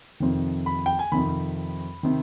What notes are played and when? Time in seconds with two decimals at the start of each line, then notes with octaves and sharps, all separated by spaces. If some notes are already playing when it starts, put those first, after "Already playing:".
0.20 F2 C3 D#3
0.66 B5
0.86 G5
0.99 G#5
1.12 F2 C3 D#3 B5
2.03 C3 D#3